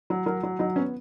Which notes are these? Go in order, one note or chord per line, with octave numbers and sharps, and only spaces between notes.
F#3
F#3 A#4
F#3
F#3 D#4
B3 C#4